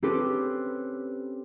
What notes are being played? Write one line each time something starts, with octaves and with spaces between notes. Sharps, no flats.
C4 C#4 G4 A4 B4